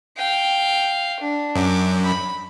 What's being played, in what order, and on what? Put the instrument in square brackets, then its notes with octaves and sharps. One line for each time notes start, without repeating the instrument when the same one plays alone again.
[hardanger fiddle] F5 G5
D4
[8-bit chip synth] F#2 [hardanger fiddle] D6
[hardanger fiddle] B5